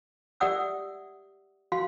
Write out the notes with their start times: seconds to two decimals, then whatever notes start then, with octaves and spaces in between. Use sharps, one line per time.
0.40 G4 D5 E5 F#5 D#6 E6
1.72 F#4 F5 C6